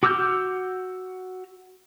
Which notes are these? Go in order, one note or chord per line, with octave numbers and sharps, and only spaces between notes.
F#4 D6 E6 F6 G6